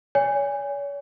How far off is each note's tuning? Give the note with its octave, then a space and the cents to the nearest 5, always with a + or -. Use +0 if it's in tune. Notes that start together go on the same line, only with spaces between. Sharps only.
C#5 +40 G#5 -20